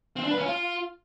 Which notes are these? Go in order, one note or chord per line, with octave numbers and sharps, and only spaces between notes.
C4
D4
B4
C#4
F4